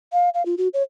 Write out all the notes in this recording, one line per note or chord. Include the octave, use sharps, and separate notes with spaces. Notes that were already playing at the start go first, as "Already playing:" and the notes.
F5
F5
F4
F#4
C#5